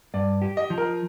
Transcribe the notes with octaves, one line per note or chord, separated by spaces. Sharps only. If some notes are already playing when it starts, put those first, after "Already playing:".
G2 D5
G4
D#5
F3
A#4